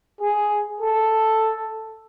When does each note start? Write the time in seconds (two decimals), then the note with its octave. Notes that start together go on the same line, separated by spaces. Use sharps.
0.20 G#4
0.81 A4